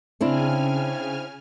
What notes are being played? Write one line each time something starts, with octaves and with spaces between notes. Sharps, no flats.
C#3 C4 D4 E4 G#5 F6